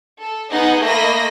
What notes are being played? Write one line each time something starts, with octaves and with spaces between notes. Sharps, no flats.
A4
B3 D#4 G#4 D#5 F#5
A3 A#3 D#5 B5 A#6